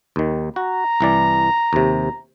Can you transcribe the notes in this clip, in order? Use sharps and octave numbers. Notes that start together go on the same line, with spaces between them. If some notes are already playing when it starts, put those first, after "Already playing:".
D#2 D#3
F#4 A#5
C2 E3 D5
D#2 C3